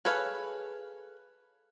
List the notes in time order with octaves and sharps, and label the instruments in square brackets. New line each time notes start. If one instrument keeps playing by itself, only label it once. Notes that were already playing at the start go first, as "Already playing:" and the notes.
[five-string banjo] G#4 A4 B4 C#5 F5